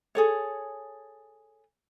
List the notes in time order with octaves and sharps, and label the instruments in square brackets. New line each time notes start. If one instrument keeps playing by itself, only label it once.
[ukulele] G#4 A4 C#5